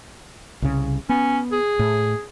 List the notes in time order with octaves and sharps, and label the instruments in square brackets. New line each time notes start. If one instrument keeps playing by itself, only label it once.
[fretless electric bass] C2 C#3
[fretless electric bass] B3 [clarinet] C#4
[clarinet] G#4
[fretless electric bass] A2